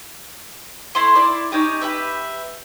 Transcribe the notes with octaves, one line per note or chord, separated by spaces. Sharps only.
A3 E4 C6
E4 D5
C#4 D#4 G4
G4 B4 E5